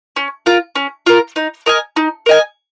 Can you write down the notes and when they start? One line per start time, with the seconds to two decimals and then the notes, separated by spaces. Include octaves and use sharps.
0.16 C#4
0.46 F4 A#4
0.76 C#4
1.06 F4 A#4
1.36 D#4
1.66 A#4 D#5 G#5
1.96 D#4
2.26 A#4 D#5 G#5